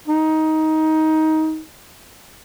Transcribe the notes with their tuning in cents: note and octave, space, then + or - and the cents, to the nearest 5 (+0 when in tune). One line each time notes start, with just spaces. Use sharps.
D#4 +15